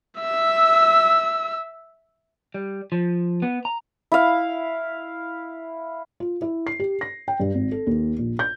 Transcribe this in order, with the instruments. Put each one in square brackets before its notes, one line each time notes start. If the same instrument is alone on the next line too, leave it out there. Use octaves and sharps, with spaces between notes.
[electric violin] E5 E6
[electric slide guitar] G3
F3
B3
A#5
[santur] E4 F5
[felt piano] F4
E4
C7
G4
A#6
G5
G2
G#1
A4
D#2
A#1
G6